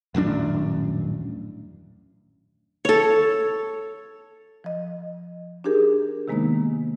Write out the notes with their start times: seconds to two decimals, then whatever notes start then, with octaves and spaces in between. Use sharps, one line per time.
0.15 D#1 A1 F#2 D4
2.85 A4 C#5
4.64 F3 D#5
5.64 D4 D#4 G4 G#4 A#4
6.28 C3 D#3 G#3 A#3 B3 D#4